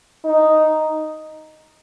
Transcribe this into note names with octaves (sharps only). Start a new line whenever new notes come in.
D#4